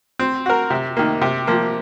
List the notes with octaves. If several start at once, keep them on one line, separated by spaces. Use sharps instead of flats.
C4
F#4 A#4
C3
D#3 A#3
C3
F3 A#3